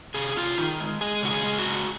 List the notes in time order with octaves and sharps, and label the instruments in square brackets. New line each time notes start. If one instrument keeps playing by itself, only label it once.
[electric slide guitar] C3 G#4
C3 F4
D#3 D#4
G#3
G#3 G#4
C#3 F#4
G#4
G#3
F#4
C#3